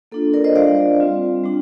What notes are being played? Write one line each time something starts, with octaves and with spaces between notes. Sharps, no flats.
A#3 D4 F4 A4
A#4 D5
C5 D#5
G3 D4 F4 D5 F5
G3 C4 F4
G3 D4